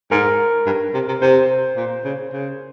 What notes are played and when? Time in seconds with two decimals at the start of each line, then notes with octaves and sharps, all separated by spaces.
0.11 G#2 A#4
0.66 G2
0.94 C3
1.08 C3
1.21 C3 C5
1.77 A#2
2.05 C#3
2.33 C#3